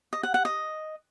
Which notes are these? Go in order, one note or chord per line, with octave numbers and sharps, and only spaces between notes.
D#5
F#5
F#5
D#5